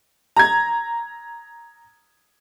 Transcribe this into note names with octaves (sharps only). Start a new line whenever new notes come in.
A#5 G#6